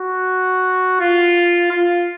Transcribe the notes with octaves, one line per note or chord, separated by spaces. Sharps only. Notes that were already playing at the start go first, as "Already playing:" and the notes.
Already playing: F#4
F4
F4